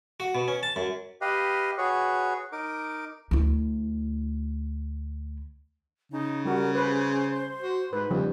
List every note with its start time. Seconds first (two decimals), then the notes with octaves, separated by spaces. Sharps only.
0.20 F#4
0.35 B2
0.48 C#4
0.63 A5
0.76 F#2
1.21 G4 B4 D#5 F5
1.78 F#4 G#4 B4 C#5
2.52 D#4 A#4 D6
3.31 D2 E4
6.12 C#3 D#4
6.45 G3 F#4 A#4
6.75 B4 C5
7.60 F#4
7.93 G#2 B4
8.11 D#2 C#3 F3 G3